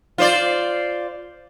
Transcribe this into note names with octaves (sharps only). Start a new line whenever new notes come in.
F4 C5 D5